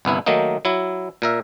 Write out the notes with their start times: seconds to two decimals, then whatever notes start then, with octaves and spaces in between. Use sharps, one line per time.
0.05 G1 C2 B3 E4
0.26 D#3 F#3 A3 A#3 D#4
0.65 F#3 E4
1.22 A#2 A#4 E5